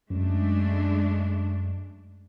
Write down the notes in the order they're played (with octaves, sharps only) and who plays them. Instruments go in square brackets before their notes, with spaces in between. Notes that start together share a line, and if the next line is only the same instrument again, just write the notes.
[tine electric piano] F#2 [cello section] G#3 A3 D4